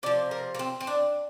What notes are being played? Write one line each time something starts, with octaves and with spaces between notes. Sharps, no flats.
C3 F3 D5
A#4
A#3
C4
C4
D4